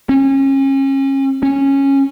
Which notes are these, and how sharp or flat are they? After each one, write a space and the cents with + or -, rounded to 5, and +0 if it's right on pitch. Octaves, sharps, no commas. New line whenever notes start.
C#4 -30
C#4 -10